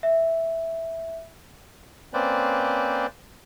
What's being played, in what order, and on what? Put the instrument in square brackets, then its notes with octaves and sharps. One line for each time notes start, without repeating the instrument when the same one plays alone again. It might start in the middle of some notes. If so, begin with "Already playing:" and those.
[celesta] E5
[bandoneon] A#3 C4 C#4 B4 C5 D5